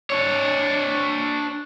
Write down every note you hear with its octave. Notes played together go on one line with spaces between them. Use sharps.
D4 C#5